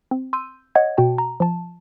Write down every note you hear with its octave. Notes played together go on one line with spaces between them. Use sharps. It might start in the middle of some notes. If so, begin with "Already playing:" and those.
C4
C6 E6 G6 D#7
C#5 D#5 F#5 G#6
B2 F#4 G5 A5
A#5
F3 A5